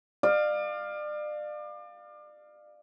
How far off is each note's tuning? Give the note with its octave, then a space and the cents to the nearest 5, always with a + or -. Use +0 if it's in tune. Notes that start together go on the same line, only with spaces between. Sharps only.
D5 +35 F5 +5